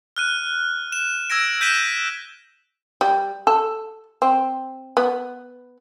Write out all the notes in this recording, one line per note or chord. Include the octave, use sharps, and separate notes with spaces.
F6 F#6 D#7
E7
E6 G#6 A#6 D7
F#6 G6 B6 D#7 E7 G7
G3
A4
C4
B3